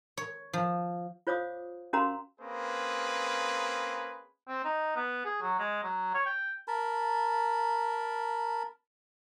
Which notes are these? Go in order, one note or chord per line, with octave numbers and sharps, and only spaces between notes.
C#5
F3
F4 C5 C#5 F5 D6 D#6
C#4 F#4 A#4 F5 A#5 C6
A#3 C4 C#4 G#4 B4
C4
D#4
B3
G#4
F#3
G#3
F#3
C#5
G5
A#4 A5 B5